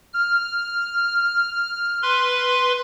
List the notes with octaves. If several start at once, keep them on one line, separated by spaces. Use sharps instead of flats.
F6
B4 C6